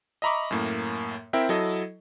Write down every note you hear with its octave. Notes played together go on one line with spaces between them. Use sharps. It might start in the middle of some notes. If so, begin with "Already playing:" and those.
D#5 E5 A#5 B5 C#6 D6
F#2 A2 A#3
C4 E4 A#4 E5 G5
F#3 E4 A4 D#5